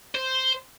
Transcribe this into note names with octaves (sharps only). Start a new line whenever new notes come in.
C5